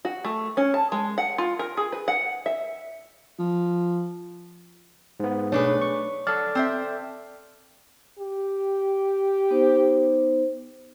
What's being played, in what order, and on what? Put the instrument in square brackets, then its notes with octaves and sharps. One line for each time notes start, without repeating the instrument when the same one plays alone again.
[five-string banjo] F#4
A3
C#4
A5
G#3
F#5
F4
A#4
G#4
B4
F#5
E5
[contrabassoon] F3
[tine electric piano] G#2 B3
[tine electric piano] B1 G#4 [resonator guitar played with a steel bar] A3 D4 B4 [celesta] C#5
[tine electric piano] C#6
[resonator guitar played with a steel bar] F#3 [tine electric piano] A4 D5 [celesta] F6
[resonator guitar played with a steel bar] C4 C5 E5
[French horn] G4
[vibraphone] B3 D#4 C5